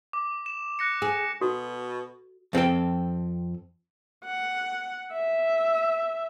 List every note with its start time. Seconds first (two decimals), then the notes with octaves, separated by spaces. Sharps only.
0.13 D6
0.46 E7
0.79 F#6 A#6 C#7
1.02 G#4
1.41 B2 F#4 A4
2.53 F2 C4 A4 G5
4.24 F#5
5.13 E5